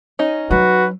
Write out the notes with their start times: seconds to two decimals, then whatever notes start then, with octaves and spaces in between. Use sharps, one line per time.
0.19 C#4 D#4
0.51 F#3 F#4 B4